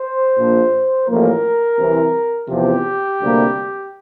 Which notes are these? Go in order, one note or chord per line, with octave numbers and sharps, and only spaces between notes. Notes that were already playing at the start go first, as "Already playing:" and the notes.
Already playing: C5
A#1 A#2 F3
A1 A2 F3 A#3 A#4
C2 C3 E3
E2 C3 F3 G4
D2 C3 G3 A#3